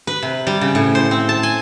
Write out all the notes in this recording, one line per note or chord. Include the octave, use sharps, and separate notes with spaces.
B4
C3
G3
C#3
A2
C5
C4
A5
G#5